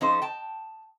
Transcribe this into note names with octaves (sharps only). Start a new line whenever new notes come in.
F3 C#4 D#4 A4 C5
G5 A5